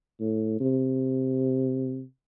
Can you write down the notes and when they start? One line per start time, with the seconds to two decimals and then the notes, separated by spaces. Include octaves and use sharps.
0.20 A2
0.60 C3